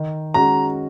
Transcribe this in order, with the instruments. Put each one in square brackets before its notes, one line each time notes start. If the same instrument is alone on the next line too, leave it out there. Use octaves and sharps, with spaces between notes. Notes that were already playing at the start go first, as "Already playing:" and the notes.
Already playing: [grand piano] D#3
[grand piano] G#3 C#4 F#4 [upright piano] A#5